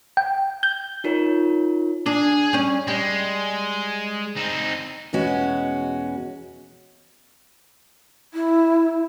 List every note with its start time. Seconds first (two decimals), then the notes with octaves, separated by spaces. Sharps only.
0.17 G5
0.63 G6
1.04 D#4 F4 A#4 C#5
2.06 D4 G#4
2.53 G3 C#4
2.88 G3 G#3
4.36 C4 D#4
5.13 E2 B2 G#3 C#4 F#4
8.34 E4